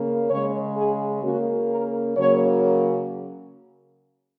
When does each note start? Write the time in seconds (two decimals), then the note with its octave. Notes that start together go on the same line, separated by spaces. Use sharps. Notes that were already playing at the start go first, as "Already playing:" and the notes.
Already playing: C#3 A#3
0.29 C#3 G#3 C#5
0.76 G#4
1.23 C#3 A#3 F#4
1.70 A#4
2.17 C#3 F#3 A#3 C#5